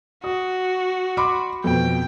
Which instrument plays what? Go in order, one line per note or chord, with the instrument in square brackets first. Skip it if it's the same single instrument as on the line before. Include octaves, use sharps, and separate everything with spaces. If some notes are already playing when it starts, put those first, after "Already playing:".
[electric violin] F#4 [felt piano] D#6
[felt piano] B5 C6 D6
[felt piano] F2 B2 [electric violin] G5